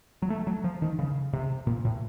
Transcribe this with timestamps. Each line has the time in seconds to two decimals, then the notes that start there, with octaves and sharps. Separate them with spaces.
0.22 F#3
0.30 A3
0.47 F#3
0.64 F3
0.82 D#3
0.99 C#3
1.33 C3
1.67 A#2
1.85 A2